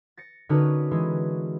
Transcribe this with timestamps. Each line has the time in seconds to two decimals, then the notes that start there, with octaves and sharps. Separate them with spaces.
0.17 A6 A#6 C#7
0.49 D3 C#4 D#4 F#4 A#4 B4
0.91 E3 G#3